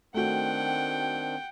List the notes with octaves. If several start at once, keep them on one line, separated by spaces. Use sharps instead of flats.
D#3 A3 C4 D4 F#4 F#5 G5